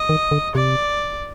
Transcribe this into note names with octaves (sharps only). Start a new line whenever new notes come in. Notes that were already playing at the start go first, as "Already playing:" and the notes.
Already playing: D#5
D#3
D3
C3 D5